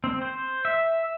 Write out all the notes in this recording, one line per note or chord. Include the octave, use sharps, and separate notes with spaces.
C4
C5
E5